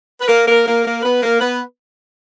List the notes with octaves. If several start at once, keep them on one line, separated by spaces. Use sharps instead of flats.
B4
A#3 A#4
A#3 A#4
A#3 A#4
A#3 A#4
B3 B4
A#3 A#4
B3 B4